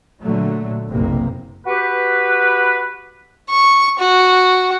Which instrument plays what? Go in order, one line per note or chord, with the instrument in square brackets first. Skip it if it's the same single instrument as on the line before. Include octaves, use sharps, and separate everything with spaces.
[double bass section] A#2 D3 F#3 A3
F#1 B1 C3 A#3
[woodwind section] F#4 G4 B4
[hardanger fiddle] C#6
F#4